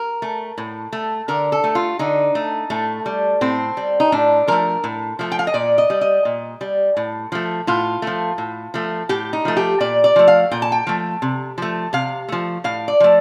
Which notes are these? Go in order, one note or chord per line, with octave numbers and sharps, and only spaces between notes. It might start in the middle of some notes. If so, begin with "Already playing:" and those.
Already playing: A#4
A3
A2
A3
D3 A#4
A4
A3
F4
D3 D#4
A3
A2 A3
G3
A2 C4
G3
D#4
A2 D4
F3 A3 A#4
A2
F3 A3
G5
F5
D#5
A#2 D5
D#5
G3
D#5
A#2
G3
A2
F3 A3
A2 F4
F3 A3
A2
F3 A3
A2 G4
D#4
F3 A3
G4
A#2 D5
D5
F3 A3
F5
A#2 G5
A5
G5
F3 A3
C3
F3 A3
C3 F5
F3 A3
A2 F5
D5
F3 A3